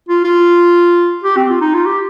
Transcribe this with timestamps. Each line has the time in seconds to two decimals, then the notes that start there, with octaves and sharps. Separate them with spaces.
0.09 F4
0.25 F4
1.24 G4
1.37 C4
1.49 F4
1.61 D#4
1.74 F4
1.86 G4